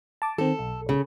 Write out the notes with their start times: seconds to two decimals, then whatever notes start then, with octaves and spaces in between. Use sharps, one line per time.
0.22 A5 D6
0.38 D#3 C4 A4
0.59 B1
0.89 C#3